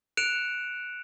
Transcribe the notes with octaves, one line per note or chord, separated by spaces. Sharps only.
F#6 C#7 D7 E7 F7